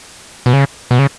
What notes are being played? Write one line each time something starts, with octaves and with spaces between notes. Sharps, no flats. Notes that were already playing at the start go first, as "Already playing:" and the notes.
B2
C#3
B2
C#3